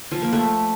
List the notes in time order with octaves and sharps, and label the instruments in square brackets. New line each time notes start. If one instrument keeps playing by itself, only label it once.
[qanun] F3
A#3
A3